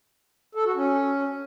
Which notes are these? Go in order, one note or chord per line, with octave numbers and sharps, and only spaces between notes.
A4
F#4
C#4